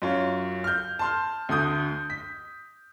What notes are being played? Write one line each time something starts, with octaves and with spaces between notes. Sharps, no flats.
F#2 C#4 F4
F6 G6
A5 C6 F6
D2 D3 D#6 G6
B6